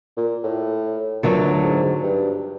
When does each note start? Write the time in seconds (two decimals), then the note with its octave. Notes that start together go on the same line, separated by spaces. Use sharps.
0.17 A#2
0.44 A2
1.23 D2 A#2 D3 F#3 B3
1.64 G#2
2.03 G2